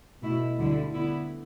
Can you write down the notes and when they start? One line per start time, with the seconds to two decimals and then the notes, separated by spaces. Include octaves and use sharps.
0.22 B2 A3 E4
0.58 D2 D3 G3 E4
0.93 D3 B3 E4